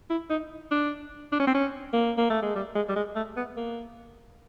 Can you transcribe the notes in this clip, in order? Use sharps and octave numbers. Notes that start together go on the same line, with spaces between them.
E4
D#4
D4
D4
C#4
C4
C#4
A#3
A#3
A3
G#3
G3
G#3
G3
G#3
A3
B3
A#3